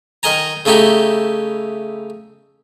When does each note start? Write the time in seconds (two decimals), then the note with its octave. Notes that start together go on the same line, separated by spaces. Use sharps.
0.23 D#3 A#4 D#5 G#5 A#5
0.65 C#3 A3 D#4 E4 G4